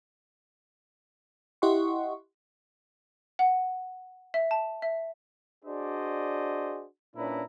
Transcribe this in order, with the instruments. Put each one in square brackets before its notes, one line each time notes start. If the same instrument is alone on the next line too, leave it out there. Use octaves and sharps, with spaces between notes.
[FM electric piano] E4 G4 D#5 F#5 C6 C#6
[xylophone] F#5
E5
A5
E5
[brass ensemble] D4 F#4 G#4 C5 D5 D#5
A#2 C#4 D4 E4 B4 A#5